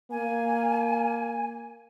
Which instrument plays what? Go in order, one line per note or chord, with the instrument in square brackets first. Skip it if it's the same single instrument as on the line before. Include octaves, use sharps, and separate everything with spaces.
[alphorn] A#3 [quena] G#5